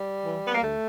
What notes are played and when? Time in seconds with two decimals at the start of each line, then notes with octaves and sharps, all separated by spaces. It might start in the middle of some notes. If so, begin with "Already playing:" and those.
Already playing: G3
0.24 E3
0.48 B3
0.55 A#3
0.61 D2 A3